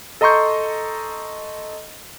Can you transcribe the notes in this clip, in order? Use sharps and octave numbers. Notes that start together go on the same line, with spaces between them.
A4 D#5 A#5 C6 C#6 G6